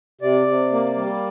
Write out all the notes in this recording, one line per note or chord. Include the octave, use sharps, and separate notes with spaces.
C3 D5
C3
A#3
G3